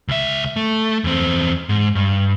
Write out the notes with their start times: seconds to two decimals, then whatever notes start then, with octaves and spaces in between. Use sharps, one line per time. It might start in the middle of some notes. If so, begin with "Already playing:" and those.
0.08 C#2 E5
0.56 A3
1.04 E2 C4
1.69 G#2
1.95 G2